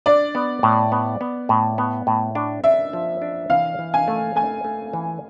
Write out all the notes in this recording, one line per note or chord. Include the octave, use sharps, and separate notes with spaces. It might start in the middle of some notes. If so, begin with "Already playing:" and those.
D4 D5
B3
A2
B3
B3
A2
B3
A2
D4
D4 E5
F3
D4
E3 F5
E3
G#5
A3
A3 G#5
A3
E3